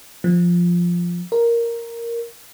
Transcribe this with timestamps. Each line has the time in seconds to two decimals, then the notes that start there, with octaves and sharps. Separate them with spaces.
0.24 F3
1.32 A#4